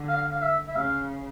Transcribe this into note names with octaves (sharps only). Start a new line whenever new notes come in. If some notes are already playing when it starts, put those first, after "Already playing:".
Already playing: D3
F5
F5
E5
E5
C#3 F5